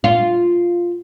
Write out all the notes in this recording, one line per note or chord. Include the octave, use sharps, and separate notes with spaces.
F4